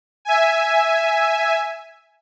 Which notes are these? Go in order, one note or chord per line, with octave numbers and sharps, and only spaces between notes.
E5 G#5